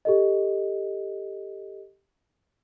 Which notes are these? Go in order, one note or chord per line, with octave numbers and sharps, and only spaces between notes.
G4 A4 D#5